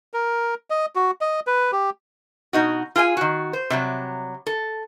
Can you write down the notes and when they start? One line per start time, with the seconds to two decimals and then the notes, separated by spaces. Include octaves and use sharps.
0.14 A#4
0.70 D#5
0.95 F#4
1.21 D#5
1.47 B4
1.72 G4
2.53 B2 D#4 F#4
2.96 F4 G#4 G5 G#5
3.17 D#3 F#4
3.53 C5
3.70 C3 F#3 G3
4.47 A4